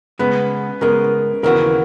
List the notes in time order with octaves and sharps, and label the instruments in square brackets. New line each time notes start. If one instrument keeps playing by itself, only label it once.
[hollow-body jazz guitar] C#3 G#3 B3 [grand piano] B4
[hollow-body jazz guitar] C#3 G#3 B3 [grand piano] A#4
[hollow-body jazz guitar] D#2 C#3 E3 B3 F#4 [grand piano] A#4